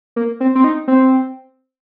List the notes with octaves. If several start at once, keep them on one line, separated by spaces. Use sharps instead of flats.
A#3
C4
C4
D#4
C4